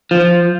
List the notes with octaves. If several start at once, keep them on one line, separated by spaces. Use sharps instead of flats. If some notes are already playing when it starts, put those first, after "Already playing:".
F3